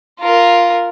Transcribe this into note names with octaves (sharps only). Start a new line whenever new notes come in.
F4 A#4